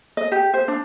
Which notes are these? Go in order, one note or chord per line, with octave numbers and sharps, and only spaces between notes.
D#5
G4
C5
D4